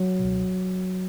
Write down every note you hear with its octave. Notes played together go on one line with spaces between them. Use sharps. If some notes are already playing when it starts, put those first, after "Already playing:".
Already playing: F#3
C#2 B2